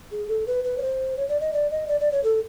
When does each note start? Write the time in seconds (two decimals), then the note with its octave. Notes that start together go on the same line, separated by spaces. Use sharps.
0.12 G#4
0.28 A4
0.47 B4
0.64 B4
0.78 C#5
0.82 C5
1.17 C#5
1.29 D5
1.41 D#5
1.53 D5
1.71 D#5
1.88 D5
2.00 D5
2.12 C#5
2.24 A4